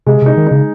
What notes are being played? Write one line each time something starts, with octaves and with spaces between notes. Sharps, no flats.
C3 G#3
C3 D#4
D#3
C#3 D#4